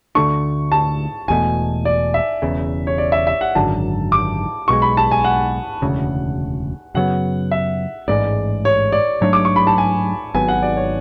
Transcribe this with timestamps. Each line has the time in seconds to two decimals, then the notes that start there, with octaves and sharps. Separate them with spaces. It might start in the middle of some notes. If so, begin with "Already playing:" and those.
0.15 D2 D3 A3 D4 C#6
0.72 A5
1.28 E1 E2 B2 A3 G#5
1.85 D5
2.14 E5
2.42 E1 E2 C#3
2.87 C#5
2.98 D5
3.12 E5
3.27 E5
3.41 F#5
3.55 G#1 F#2 D3 F#3 A5
4.12 D6
4.68 B1 B2 G#3 C#6
4.82 B5
4.97 A5
5.11 G#5
5.24 F#5
5.82 E1 D2 C#3
6.94 F#2 C#3 F#3 B3 F#5
7.51 E5
8.08 A1 G#2 G#3 D5
8.65 C#5
8.92 D5
9.21 G#2 F#3 A3 D4 C#5
9.33 D6
9.45 C#6
9.56 B5
9.67 A5
9.78 G#5
10.35 G#1 G#2 F#3 B3 G#5
10.48 F#5
10.63 D5
10.77 C#5